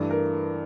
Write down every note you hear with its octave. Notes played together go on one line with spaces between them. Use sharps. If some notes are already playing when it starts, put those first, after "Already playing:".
Already playing: G2 E3 A3
A#4